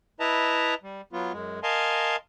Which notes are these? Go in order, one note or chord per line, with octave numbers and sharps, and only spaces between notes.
E4 B4 D#5 E5 A5 A#5
G3
F#3 B3 F4
F#2 G#3
A#4 D#5 F5 G#5 A5 C6